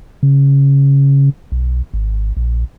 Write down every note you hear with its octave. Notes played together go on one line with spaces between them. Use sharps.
C#3
B1
G#1
A#1